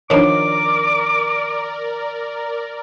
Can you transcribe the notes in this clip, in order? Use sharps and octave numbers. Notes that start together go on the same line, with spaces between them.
D#3 F3 D4 A#4 C#5 D5 D6